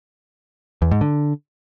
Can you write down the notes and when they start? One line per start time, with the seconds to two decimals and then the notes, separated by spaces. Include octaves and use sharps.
0.82 E2
0.91 G#2
1.01 D3